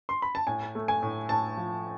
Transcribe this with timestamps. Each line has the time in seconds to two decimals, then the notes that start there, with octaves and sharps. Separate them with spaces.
0.09 C6
0.22 B5
0.35 A5
0.47 A2 G#5
0.75 A3
0.88 G#5
1.03 A2
1.29 A2 A5
1.57 F3